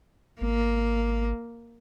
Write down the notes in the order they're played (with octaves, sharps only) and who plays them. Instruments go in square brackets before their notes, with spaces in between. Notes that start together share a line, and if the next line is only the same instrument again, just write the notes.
[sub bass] G#1 [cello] A#3